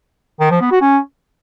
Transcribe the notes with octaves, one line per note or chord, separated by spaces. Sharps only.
D#3
F3
B3
F#4
C#4